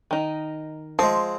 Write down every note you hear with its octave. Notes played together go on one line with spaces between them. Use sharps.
D#3 D#4
F3 G#3 C4